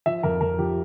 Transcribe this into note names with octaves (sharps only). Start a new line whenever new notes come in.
F3 E5
F2 A#4
F2 A#4
F3 G4